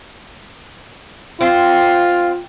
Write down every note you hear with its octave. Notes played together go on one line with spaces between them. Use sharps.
C4 F4